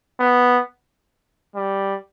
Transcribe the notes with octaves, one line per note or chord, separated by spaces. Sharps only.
B3
G3